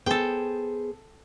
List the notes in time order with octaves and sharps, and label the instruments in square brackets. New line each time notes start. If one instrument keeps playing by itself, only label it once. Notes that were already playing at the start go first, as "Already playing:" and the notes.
[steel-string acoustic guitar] B3 G#4 C5 [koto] A4 G5